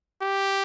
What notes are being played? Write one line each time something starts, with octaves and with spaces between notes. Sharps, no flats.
G4